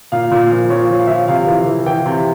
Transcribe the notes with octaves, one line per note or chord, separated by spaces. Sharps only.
A#2 F5
A#2
F3
F3 C#5
F3
F5
F3 E5
F5
C3 F5
E3
E3
E3 G5
C3